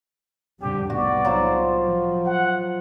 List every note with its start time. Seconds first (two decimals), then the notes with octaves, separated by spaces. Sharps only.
0.61 F2 D3 G3 G4
0.90 C2 A2 B3 F#4 D5
1.25 F#3 F4 C5
1.85 F3
2.26 F#5